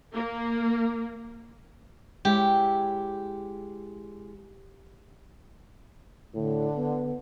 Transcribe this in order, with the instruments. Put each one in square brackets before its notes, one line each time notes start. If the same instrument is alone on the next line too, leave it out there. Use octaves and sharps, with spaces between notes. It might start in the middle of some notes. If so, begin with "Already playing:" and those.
[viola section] A#3
[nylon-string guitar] G#3 E4 C#5 [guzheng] G4
[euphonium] A2 [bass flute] D3
[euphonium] B3